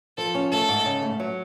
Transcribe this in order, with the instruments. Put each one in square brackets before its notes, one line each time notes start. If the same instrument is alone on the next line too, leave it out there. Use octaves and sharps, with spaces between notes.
[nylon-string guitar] F3 [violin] A4
[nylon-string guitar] C#4
[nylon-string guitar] A3 [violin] A4
[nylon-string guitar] G#2
C#3
A3
F#3